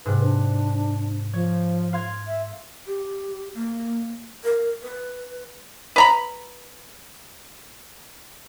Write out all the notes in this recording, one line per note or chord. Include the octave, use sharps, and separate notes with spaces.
G#2 C3 B4
D4
F3 C#5
F5 C6 G#6
E5
G4
A#3
A#4
B4
B4 A#5 B5